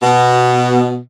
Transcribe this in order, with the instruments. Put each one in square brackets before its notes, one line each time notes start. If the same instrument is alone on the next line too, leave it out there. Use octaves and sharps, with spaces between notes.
[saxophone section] B2